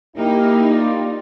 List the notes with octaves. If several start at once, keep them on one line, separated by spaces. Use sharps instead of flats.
A#3 D#4 E4 G4 A#4
F4 G4 D5